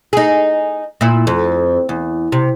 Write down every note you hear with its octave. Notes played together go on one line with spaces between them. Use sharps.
D#4 G#4
A#2 E4
F2
E2
C3